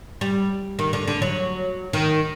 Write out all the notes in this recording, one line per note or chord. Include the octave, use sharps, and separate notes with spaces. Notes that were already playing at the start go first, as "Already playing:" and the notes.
G3
D#3
D3
D3
F#3
D#3